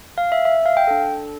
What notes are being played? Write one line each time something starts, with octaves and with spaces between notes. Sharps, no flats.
F5
E5
E5
F5
G5
D4 A4